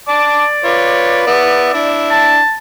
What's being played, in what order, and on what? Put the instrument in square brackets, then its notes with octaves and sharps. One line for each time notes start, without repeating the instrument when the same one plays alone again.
[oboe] D5 [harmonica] A5 D6
[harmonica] F4 B4 C#5
B3 E4
D4 E4
[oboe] A5